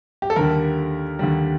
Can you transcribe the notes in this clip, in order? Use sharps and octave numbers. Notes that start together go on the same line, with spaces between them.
G4
A4
D#2 D3 G3 A#4
D#2 D3 G3